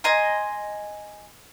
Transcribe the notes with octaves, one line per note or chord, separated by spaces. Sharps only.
D#5 G#5 A#5 C6